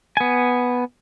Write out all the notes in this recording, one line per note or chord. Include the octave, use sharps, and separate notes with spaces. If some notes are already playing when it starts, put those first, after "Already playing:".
B3 G#5